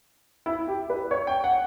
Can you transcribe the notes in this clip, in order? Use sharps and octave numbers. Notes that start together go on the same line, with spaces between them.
E4
G4
B4
C#5
G5
F#5